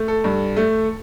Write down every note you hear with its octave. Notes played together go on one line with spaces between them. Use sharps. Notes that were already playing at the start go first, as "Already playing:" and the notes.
Already playing: A3
A4
G2
A3